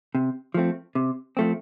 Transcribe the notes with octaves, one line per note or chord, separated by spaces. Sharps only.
C3
F3 A3 C4
C3
F3 A3 C4